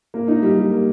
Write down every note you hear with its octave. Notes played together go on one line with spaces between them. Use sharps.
A#3
D#4
G3
G3
A#3